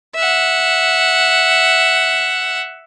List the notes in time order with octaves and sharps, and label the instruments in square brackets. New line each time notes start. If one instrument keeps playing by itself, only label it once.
[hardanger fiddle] E5 F#5